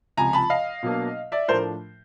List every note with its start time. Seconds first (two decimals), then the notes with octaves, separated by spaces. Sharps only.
0.17 C#2 C3 F3 G#5 A#5
0.33 A5 B5
0.50 D#5 F5
0.83 B2 F#3 A#3 D4
1.32 D5 E5
1.48 A2 F3 A3 D4 A#4 C5